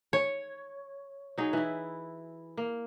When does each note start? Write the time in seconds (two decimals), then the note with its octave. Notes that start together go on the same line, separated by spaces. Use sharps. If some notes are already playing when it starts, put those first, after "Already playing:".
0.13 C#5
1.38 F#3 D#4 G#4
1.53 E3 E4
2.57 A#3